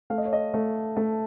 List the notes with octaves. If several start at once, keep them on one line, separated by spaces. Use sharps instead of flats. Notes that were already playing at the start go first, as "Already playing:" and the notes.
A3 F5
D#5
C#5
D#5
A3
A3 A5